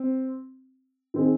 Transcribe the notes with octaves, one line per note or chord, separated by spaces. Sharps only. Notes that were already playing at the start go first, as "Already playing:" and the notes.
Already playing: C4
D#3 C4 G#4